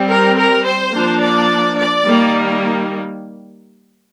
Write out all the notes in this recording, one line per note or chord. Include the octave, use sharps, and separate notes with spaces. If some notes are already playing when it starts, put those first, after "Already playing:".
Already playing: G3 C4
A#4
A#4
C5
F3 A#3 D4
D5
D5
D#3 G3 A#3